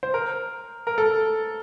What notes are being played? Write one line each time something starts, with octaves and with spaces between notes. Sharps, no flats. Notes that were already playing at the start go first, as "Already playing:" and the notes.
C5
A#4
A#4
A4